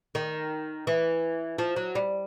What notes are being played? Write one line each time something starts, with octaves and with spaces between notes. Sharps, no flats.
D#3
E3
F3
F#3
G3